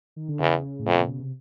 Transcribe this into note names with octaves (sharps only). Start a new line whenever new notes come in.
D#3
D3
E2 C#3
A2
F2
A#2
B2
C3